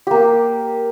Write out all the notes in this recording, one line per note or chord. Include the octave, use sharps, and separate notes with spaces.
A#3 G4